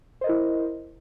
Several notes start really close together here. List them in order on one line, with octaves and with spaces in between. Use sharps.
C5 D#5 A#4 E4